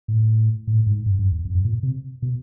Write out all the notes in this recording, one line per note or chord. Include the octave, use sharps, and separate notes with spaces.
A2
A2
G#2
G2
F#2
E2
F2
F#2
A#2
C3
B2